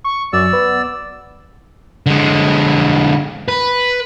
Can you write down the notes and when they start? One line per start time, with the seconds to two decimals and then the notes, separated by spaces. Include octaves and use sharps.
0.04 C#6
0.33 F#2 D5 E6
0.53 B3
2.06 D3 G#3
3.48 B4